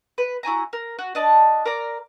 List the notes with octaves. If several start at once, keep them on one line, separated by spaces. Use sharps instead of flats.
B4
E4 F#4 G#5 A#5
A#4
F#4
D4 D#5 A5
A#4 D5 A#5